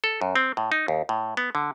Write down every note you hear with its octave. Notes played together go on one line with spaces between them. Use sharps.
A4
F#2
C4
A2
D#4
D#2
A2
B3
D3